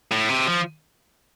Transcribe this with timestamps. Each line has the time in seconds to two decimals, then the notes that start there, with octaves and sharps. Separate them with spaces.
0.11 A2
0.29 C3
0.47 F3